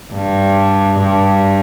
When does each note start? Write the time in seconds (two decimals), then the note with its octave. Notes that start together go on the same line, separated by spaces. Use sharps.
0.13 G2
1.00 G2